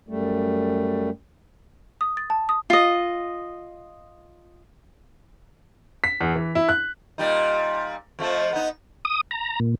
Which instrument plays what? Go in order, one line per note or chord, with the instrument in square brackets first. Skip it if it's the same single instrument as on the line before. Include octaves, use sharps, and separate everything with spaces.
[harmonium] F#2 G3 A3
[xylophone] D#6
A6
A5
D#6
[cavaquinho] F4 D#5
[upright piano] B6
E2
E3
E4
F#6
[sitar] A#2 G3 D#4
F2 F3 A3
B3 D#4
[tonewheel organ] D#6
A#5
A#2